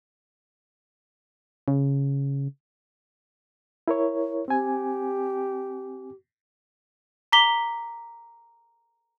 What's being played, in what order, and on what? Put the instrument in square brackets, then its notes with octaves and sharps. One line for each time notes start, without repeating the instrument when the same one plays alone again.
[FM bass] C#3
[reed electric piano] E4 A#4 C#5
[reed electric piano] C4 G#5 [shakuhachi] G4
[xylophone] A#5 D6 B6 G7